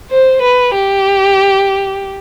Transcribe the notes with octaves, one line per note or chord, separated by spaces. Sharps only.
C5
B4
G4